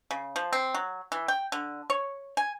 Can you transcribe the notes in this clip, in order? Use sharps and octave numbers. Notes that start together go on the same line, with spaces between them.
C#3
F3
C4
F#3
E3
G5
D3
C#5
G#5